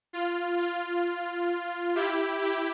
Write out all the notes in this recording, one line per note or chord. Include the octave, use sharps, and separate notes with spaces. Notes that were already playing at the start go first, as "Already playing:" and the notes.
F4
F4
E4 G4
E4 G4